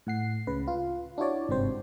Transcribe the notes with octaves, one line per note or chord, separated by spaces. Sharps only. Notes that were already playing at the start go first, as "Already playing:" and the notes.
A2 F#5 C7
C#2 C#3 B4
F4
D4 E4 F#4 C#5 D5
G1 G#2 C3 C4 C5